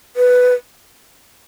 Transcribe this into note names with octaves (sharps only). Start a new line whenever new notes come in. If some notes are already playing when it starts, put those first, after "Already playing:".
B4